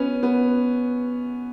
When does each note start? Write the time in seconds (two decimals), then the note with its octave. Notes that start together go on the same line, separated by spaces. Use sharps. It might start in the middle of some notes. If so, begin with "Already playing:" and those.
Already playing: B3 C#4
0.23 B3